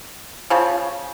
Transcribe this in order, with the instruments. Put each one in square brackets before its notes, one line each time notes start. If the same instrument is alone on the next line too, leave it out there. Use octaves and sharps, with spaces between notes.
[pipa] C#3 F3